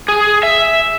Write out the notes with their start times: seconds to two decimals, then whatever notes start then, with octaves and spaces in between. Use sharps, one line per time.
0.08 G#4
0.43 E5